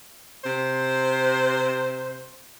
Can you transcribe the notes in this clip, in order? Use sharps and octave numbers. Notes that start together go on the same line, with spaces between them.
C3 C5